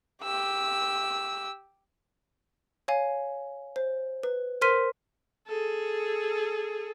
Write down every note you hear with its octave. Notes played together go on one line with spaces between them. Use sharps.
G4 E6
C#5 F5 G#5
C5
B4
A#4 C5 C6 F6 B6 D#7
G#4 A4